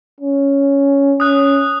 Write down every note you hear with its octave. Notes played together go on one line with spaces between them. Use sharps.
C#4
C#4 D#6 F#6